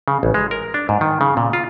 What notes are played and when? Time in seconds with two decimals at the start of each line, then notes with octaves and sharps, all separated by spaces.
0.08 C#3
0.23 A1
0.34 G#3
0.51 A#4
0.74 D4
0.89 G#2
1.01 D#3
1.21 C#3
1.37 A#2
1.53 F4